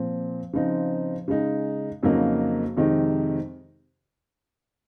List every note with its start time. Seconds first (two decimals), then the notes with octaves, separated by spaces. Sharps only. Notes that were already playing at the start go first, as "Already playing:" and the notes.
Already playing: A#2 F3 C4
0.53 C#3 F3 C4 D#4
1.28 C#3 G#3 D#4
2.03 F2 C#3 F#3 A#3 D#4
2.76 F2 C3 D#3 G#3 D#4